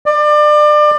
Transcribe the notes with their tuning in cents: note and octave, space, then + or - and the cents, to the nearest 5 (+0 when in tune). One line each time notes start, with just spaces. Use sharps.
D5 +30